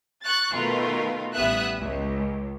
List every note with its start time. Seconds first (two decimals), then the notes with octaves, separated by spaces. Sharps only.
0.23 C#6 F#6 A6
0.54 B2 D#3 A3 F4 A#4 B4
1.34 A1 G3 B3 E5 D#6 F#6
1.79 C#2